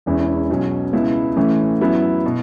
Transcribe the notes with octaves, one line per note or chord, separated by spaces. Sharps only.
E1 E2 E3 C#4 E4
B1 B2 F#3 C#4
C#2 B2 B3 E4
A2 E3 A3 C#4
F#2 F#3 B3 E4
B2